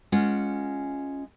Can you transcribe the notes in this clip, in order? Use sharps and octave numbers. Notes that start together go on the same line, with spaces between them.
G#3 C#4 F4 F#5